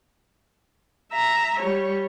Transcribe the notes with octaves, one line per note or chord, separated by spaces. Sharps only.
E5 A#5
G3 C#5